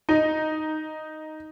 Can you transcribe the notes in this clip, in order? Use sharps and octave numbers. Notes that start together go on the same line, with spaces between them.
D#4